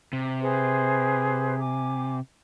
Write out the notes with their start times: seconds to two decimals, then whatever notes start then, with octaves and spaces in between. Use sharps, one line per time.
0.13 C3
0.40 G#4 B4 C5
1.58 G#5 D6